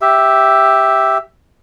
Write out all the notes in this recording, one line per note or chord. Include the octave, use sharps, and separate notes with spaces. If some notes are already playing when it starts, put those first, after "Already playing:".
G4 E5